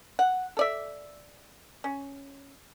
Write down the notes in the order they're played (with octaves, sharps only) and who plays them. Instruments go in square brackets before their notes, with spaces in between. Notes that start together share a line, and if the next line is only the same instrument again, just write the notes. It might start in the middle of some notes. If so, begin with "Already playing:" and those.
[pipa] F#5
A4 D5 E5
C#4